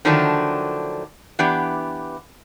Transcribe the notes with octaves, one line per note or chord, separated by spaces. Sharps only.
D3 D#3 F3 F#3 A3 D4
E3 B3 D4 G4